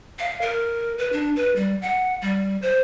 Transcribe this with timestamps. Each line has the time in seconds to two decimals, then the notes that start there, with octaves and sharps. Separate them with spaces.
0.19 F5
0.41 A#4
0.98 B4
1.13 D4
1.36 B4
1.56 G3
1.82 F#5
2.22 G3
2.62 C5